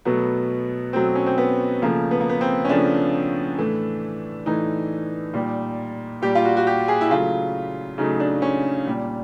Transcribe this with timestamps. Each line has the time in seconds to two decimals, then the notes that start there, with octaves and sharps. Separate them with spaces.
0.05 B2 F#3 A3 B3
0.93 B2 F#3 A3 C4
1.15 C#4
1.27 C4
1.38 B3
1.82 C#3 F3 A3 A#3
2.11 B3
2.21 A#3
2.29 B3
2.41 C4
2.65 C#4
2.69 C#3 F3 A3 D4
3.58 A2 E3 A3
4.46 A2 E3 A3 D#4
5.34 A#2 G3
6.22 A#2 G3 G4
6.35 F4
6.45 F#4
6.57 F#4
6.67 G4
6.88 G#4
7.01 E4
7.10 C#3 F#3 A3 F4
7.98 C#3 F#3 A3 D#4
8.20 D4
8.42 C#4
8.87 A#2 G3